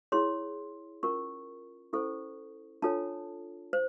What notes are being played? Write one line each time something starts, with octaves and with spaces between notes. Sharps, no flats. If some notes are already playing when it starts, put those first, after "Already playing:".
E4 G#4 C#5 C6
C#4 F4 A#4 C#6
C#4 E4 A4 C5 C#6
D4 F4 A4 C#5 A5
C5